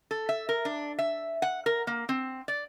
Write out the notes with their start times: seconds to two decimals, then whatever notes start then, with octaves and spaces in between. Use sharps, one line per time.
0.11 A4
0.29 E5
0.49 A#4
0.65 D4
0.98 E5
1.42 F#5
1.66 A#4
1.87 A#3
2.09 C4
2.48 D5